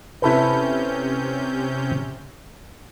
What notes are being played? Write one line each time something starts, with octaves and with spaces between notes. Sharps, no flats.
C3 C#4 E4 A4 B4 G6